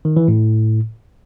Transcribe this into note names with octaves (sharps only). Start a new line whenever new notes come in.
D#3
E3
A2